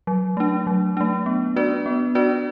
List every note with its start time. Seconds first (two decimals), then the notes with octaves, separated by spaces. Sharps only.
0.07 F#3
0.37 A3 D4
0.67 F#3
0.97 A3 D4
1.26 B3
1.56 D4 F#4 B4 D5
1.86 B3
2.15 D4 F#4 B4 D5